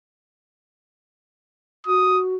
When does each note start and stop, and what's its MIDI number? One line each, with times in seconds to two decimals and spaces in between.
1.87 2.35 66
1.87 2.21 87